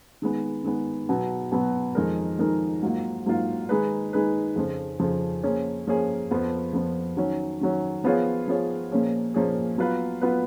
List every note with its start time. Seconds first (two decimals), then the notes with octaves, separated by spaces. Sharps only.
0.22 D#3 G#3 B3
0.64 D#3 G#3 B3
1.09 B2 F#3 B3
1.52 B2 F#3 B3
1.95 F2 D#3 G#3 D#4 A#4
2.39 F2 D#3 G#3 D#4 A#4
2.82 G#2 F#3 A#3 F4
3.26 G#2 F#3 A#3 F4
3.69 D#3 G#3 D#4 G#4 B4
4.13 D#3 G#3 D#4 G#4 B4
4.56 F2 C#3 F3
4.99 F2 C#3 F3
5.43 F3 A#3 C#4 G#4
5.87 F3 A#3 C#4 G#4
6.31 F2 F3 B3
6.73 F2 F3 B3
7.17 D#3 F#3 C#4
7.61 D#3 F#3 C#4
8.04 F3 B3 F4 G#4 C#5
8.48 F3 B3 F4 G#4 C#5
8.92 A#2 F3 A#3 C#4 G#4
9.34 A#2 F3 A#3 C#4 G#4
9.78 F#3 B3 F4 B4
10.21 F#3 B3 F4 B4